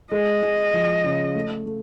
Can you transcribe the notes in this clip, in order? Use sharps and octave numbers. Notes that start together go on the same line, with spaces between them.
G#3 D#5
G#3
F3
C#3
A3
A3